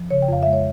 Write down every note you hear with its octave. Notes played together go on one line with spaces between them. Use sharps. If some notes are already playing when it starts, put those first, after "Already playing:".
Already playing: F3
C#3 C#5
G5
F2 F5
G#3 E5
C#5